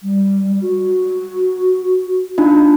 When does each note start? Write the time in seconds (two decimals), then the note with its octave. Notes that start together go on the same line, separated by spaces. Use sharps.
0.03 G3
0.61 F#4
2.38 D4 D#4 F4